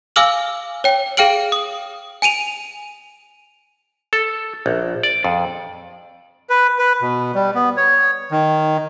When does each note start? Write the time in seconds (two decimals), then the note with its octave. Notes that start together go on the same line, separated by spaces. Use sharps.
0.16 F5 G#5 D6 E6 F6 F#7
0.84 C#5 G5
1.17 G#4 F5 G5 F6 D7 F#7
1.52 D#6
2.22 G#5 D7 D#7 F7
4.13 A4
4.66 A#1
5.03 D5
5.24 F2
6.50 B4
6.78 B4
7.02 B2
7.35 G3
7.55 B3
7.77 C#5
8.31 D#3